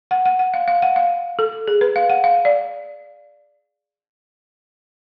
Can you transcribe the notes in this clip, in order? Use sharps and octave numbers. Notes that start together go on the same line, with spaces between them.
F#5
F#5
F#5
F5
F5
F#5
F5
A4
G#4
B4
F5
F#5
F5
D5